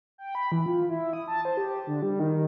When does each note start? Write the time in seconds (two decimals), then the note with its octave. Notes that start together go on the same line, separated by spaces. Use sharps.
0.18 G5
0.35 B5
0.52 E3
0.66 F4
0.89 E4
1.13 D#6
1.28 A5
1.45 C5
1.57 G4
1.87 D3
2.02 G3
2.20 D#3